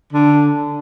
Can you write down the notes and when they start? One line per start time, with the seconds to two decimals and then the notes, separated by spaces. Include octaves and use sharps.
0.10 D3